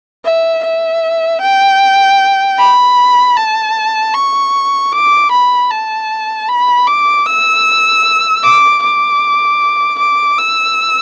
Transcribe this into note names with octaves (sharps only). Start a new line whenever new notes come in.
E5
E5
G5
B5
A5
C#6
D6
B5
A5
B5
D6
E6
D6
D6
D6
E6